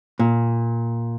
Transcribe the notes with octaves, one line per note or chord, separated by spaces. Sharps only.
A#2